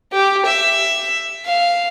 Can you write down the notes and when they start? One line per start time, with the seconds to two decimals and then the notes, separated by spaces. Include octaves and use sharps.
0.12 G4
0.45 E5
1.46 F5